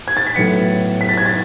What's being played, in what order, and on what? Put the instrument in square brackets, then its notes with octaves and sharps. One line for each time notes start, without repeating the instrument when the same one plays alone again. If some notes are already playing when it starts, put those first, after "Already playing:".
[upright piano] G#6
A6
B6
A2 F#3 B3 C#7
B6
A6
G#6
A6